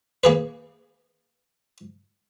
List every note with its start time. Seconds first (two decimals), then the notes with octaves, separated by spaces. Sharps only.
0.24 A#3 G#4 B4